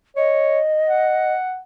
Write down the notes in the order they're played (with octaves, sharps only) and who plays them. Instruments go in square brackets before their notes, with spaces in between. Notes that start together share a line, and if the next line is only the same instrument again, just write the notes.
[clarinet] C#5 [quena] D#5
[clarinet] F#5